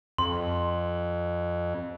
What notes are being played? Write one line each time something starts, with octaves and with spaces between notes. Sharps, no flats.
F2 C6